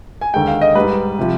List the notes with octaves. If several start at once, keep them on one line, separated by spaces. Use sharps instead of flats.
G#5
D#2 D3 G#3 G5
F5
D#5
G#2 G3 B4
C3 F3